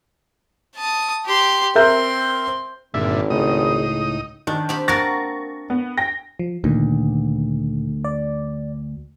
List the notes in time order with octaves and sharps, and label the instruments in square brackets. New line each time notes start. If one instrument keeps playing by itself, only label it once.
[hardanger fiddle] A5 D#6
G4 C6
[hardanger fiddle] C4 C6 [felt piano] A#4 E5 G6
[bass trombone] G#1 [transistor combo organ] G2 A#2 D3 [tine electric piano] E5
[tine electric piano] C#2 A2 [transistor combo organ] D#4 D#6 [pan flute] G#4
[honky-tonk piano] D#3 [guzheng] D4
[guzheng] C4 G4 B5
[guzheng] A#3 F#4 A#4 [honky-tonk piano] C#6 A6 A#6
[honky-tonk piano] B3
G5 A#6
[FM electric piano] F3
[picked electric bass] D2 [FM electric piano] A#2 D#3
[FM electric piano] D5